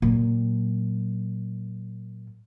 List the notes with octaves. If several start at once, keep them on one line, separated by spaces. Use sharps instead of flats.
A#2 F#3